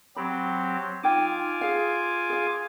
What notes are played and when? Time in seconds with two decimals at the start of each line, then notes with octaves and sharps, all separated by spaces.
0.16 F#3 C4 G4 B5
1.03 D#4 F4 G5 G#5 D6
1.61 G#4 F5
2.30 G#4 F5